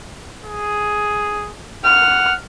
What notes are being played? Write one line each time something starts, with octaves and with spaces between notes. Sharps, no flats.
G#4
F#5 F6